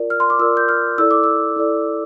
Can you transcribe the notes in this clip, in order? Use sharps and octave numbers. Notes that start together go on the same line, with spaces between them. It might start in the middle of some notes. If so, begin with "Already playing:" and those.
Already playing: F4 A#4 D5
F6
C6
D6
F4 A#4 D5 E6
G6
F6
E4 A4 D5 E6
D6
E6
E4 A4 D5